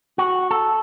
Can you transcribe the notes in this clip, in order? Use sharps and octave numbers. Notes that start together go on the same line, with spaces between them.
F#4
A4